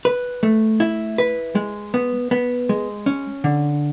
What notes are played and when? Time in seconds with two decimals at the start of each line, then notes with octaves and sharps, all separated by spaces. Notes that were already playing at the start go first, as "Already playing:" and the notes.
0.05 B4
0.43 A3
0.80 E4
1.18 B4
1.55 G#3
1.94 B3
2.31 B3
2.69 G#3
3.06 C#4
3.44 D3